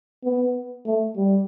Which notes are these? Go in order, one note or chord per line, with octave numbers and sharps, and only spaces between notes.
B3
A3
G3